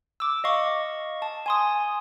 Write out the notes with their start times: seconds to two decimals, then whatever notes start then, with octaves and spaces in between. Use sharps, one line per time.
0.20 D6 E6
0.44 D#5 F5 C#6
1.22 A5
1.46 G#5 C6 D#6